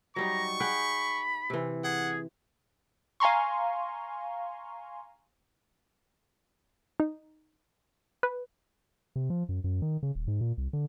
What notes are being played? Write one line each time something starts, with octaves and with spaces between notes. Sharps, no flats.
F#3 G3 D#4 A#5 C#6
G#4 F#5 G5 B5
C3 E3
G#4 F#5
F5 G#5 A#5 C6 C#6
D#4
B4
C3
F3
F#2
F#2
D#3
C#3
D#1
G#2
A#2
C2
D3